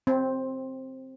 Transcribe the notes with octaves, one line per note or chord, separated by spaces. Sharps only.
C4